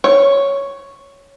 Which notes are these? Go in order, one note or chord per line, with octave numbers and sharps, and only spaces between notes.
C#5